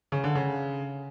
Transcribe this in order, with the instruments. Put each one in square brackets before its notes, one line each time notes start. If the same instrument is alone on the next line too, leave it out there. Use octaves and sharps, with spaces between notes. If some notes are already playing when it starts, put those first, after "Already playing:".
[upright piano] C#3
D3
C#3